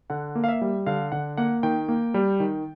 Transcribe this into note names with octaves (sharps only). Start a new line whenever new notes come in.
D3 F#5
A#3
F5
E5
G3
D3 F5
D3 F#5
A#3 F#5
D#3 G5
A#3
G3
D#3